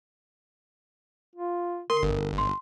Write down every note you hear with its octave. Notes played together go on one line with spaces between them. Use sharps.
F4
D3 A#4 C6
G1
C6